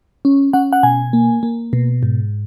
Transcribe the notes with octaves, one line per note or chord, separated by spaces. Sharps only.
C#4
C#4 F#5
F#5
B2 G#5
A#3
A#3
B2
G#2